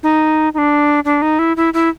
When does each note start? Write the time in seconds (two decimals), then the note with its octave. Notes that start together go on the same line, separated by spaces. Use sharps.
0.03 D#4
0.54 D#4
0.58 D4
1.05 D4
1.22 D#4
1.39 E4
1.57 E4
1.74 E4